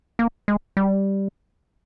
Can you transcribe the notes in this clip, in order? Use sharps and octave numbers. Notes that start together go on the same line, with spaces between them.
A#3
G#3
G3